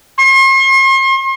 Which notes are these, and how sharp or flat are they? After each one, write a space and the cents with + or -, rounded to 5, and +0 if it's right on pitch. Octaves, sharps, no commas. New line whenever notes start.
C6 +45